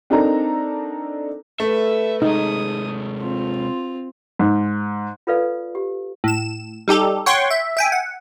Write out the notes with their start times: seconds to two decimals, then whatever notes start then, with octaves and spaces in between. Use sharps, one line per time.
0.10 C4 D4 D#4 A4 A#4 A#5
1.60 A3 A4 B4 E5
2.22 C3 G#3 D#4 G#4 D#6
3.20 C4 F4
4.39 G#2
5.27 F4 A4 B4 D5 F5
5.75 G4
6.24 A2 E7
6.88 G3 D#4 G4 A4
7.26 C#5 F#5 G5 C6 C#6
7.51 E5
7.77 E5 G5 G#5
7.92 F#5